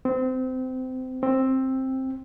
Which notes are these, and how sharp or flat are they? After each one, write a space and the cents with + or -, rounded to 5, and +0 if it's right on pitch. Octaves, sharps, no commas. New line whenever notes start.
C4 -25
C4 +10